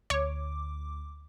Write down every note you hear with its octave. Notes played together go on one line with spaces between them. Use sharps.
D2 C#5 D6